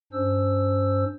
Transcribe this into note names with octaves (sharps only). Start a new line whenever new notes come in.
G2 C#4 D4 C5 E6